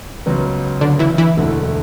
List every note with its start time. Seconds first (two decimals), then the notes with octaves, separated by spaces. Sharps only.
0.26 C#2 C#3 F#3 B3
0.81 D3 D4
0.99 E3 E4
1.18 E3 E4
1.37 E1 D2 D3 A3